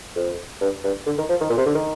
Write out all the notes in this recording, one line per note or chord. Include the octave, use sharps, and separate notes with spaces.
F2
G2
G2
D3
D#3
F3
D#3
A#2
C3
D3
D#3